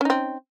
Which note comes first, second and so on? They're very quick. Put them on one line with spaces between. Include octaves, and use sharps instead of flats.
C#4 D#4 C4